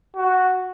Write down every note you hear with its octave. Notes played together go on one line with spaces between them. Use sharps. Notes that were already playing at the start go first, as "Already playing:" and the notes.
F#4